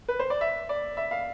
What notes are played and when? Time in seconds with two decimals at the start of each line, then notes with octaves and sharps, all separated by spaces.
0.08 B4
0.19 C5
0.30 D5
0.41 E5
0.69 D5
0.97 E5
1.11 F5